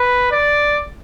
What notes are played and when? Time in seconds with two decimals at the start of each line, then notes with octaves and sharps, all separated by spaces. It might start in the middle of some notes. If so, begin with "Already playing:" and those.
Already playing: B4
0.32 D5